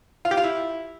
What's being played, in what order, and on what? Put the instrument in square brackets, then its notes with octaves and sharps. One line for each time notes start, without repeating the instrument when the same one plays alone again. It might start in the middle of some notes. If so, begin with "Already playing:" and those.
[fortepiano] F4
G4
F4
E4